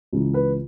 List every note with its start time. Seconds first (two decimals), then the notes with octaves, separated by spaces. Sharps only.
0.13 C#2 C#3 E3
0.34 B4